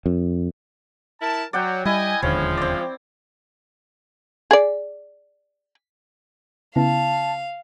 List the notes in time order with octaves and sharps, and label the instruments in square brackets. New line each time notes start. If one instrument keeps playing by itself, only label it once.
[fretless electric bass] F2
[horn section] E4 A#4 A5
[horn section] F#3 [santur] D5 F#5 G5
[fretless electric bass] G3 [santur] E4 [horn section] D#5 G#5
[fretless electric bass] E1 D#2 D3 [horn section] F3 G#3 [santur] C#4
[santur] C4 D5
[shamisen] G#4 D5
[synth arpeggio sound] C#3 B3 E4 [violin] F5 [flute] A5